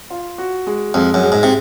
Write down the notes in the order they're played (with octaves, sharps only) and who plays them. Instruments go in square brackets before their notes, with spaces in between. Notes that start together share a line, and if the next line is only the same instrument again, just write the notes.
[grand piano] F4
F#4
G#3
[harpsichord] F2 [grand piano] G#3
[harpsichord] F#2
[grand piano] G#3
[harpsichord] G#2
C3